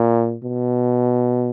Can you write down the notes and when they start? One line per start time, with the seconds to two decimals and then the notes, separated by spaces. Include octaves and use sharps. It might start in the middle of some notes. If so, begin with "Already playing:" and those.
Already playing: A#2
0.44 B2